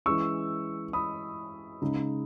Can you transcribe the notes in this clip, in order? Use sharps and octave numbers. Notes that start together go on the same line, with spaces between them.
E3 G#3 C#4 C#6 E6
B5 D#6
C#3 G#3 D#4